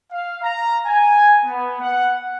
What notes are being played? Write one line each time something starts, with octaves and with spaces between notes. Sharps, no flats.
F5
A#5
G#5
B3
F#5